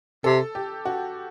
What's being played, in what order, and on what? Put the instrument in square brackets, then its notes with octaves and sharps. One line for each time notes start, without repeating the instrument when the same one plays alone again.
[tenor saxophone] C3 [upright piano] A4
[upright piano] G4
F#4